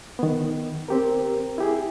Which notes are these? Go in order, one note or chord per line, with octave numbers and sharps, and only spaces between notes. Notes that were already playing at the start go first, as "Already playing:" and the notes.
D#3 B3
C4 G4 A#4
E4 G4 G#4